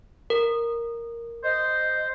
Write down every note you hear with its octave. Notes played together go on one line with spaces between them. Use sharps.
A#4
C5 D#5